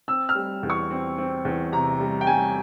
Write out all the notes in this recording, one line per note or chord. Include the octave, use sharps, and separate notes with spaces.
C4 E6
F6
G3
E2
C#6
C4
C4
E2
C3 A#5
G3
G5
G3 G#5